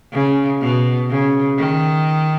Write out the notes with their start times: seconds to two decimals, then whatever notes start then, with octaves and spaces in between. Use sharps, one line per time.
0.12 C#3
0.61 B2
1.09 C#3
1.58 D#3